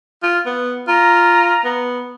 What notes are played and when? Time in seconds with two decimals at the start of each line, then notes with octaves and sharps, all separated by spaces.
0.23 F4
0.46 B3
0.88 F4 A#5
1.65 B3